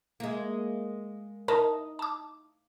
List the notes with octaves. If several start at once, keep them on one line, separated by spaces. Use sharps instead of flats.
G#3 A#3
D#4 A#4 A5 A#5
A5 D6